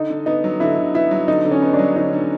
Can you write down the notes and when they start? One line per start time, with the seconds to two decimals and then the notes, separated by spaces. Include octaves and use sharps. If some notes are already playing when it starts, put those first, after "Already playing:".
Already playing: D3 D#4
0.10 D3
0.26 B3 D#4
0.44 F#3
0.60 D3 E4
0.77 D3
0.94 B3 E4
1.11 F#3
1.28 D3 D#4
1.45 D3
1.51 C#4
1.62 B3
1.73 D4
1.79 F#3
1.96 D3 D#4
2.13 D3